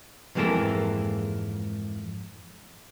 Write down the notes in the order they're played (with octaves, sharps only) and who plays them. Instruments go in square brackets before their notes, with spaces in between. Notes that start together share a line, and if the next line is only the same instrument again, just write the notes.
[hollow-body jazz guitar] F2 G#2 E3 A#3 A4 A#4